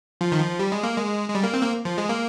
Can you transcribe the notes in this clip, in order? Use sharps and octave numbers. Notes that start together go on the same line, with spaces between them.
F3
D#3
F3
G3
G#3
A#3
G#3
G#3
G3
A#3
C4
A#3
F3
G#3
A#3